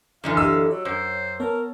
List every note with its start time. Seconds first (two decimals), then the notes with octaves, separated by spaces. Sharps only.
0.24 F#2 D3 E3 F5
0.37 G4 D#5 E6
0.71 F#3 C#5
0.85 F#2 C5
1.40 B3 A#4 C#5 A5